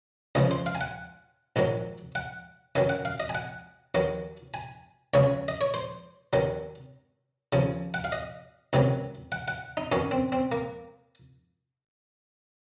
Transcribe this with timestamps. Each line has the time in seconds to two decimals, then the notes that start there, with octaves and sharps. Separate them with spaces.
0.35 C#2 C#3 F3 D#5
0.51 C5
0.66 F5
0.75 G#5
0.81 F#5
1.56 A#1 G#2 D#3 F#3
2.15 F#5
2.75 F#2 D#3 F#3 G#5
2.89 F#5
3.05 F5
3.20 D#5
3.29 G#5
3.35 F#5
3.95 D#2 D#3 F#3
4.54 G#5
5.14 C#2 C#3 F#3 C#5
5.48 D#5
5.61 C#5
5.74 C5
6.33 D#2 D#3 F#3
7.53 D#2 C#3 F3
7.94 F#5
8.04 F5
8.12 D#5
8.73 C#2 C3 D#3 F#3
9.32 F#5
9.48 F#5
9.77 D#4
9.92 F#2 D#3 F#3 C#4
10.11 C4
10.32 C4
10.52 A#3